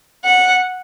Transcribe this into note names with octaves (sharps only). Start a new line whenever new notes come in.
F#5